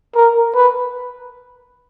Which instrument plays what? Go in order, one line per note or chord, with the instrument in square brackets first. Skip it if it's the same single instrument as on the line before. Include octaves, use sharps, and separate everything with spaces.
[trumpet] A#4
B4